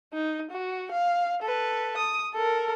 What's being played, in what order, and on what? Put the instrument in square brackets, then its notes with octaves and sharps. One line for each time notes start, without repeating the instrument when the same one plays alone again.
[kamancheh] D#4
F#4
F5
A4 B4
D#6
A4 A#4